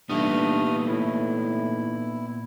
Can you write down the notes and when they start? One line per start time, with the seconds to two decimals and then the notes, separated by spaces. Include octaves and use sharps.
0.09 G2 A#2 E3 A3 B3 D#4 D#6 F6
0.87 A2 E4